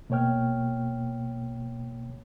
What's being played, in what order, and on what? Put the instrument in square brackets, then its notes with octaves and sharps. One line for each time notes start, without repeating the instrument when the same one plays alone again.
[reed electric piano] B2 A#3 C#5 G5 F6